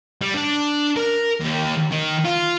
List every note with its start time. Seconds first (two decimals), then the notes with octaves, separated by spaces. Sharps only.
0.21 G3
0.34 D4
0.96 A#4
1.41 D#2
1.92 D#3
2.25 F4